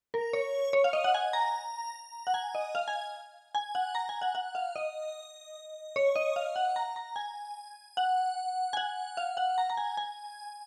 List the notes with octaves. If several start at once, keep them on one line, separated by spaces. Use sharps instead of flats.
A#4
C#5
C#5
F5
D#5
F#5
G#5
A#5
F#5
G#5
D#5
F5
G#5
G#5
F#5
A#5
G#5
F#5
F#5
F5
D#5
C#5
D#5
F5
F#5
A#5
A#5
G#5
F#5
G#5
F#5
F5
F#5
A#5
A#5
G#5
G#5